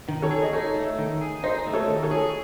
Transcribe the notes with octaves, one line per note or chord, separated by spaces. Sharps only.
D#3
A4 C#5
G#4
D#5
D#4 A4 C#5
A3
D#3
G#4
D#4 C5 D#5
A3
A4 C#5
D#3
A4 C#5
G#4